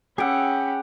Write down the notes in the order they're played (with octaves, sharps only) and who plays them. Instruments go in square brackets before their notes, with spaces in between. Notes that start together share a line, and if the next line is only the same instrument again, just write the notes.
[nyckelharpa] C#4 B5 [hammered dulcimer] G4 F#5 [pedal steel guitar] G#4 G5 E6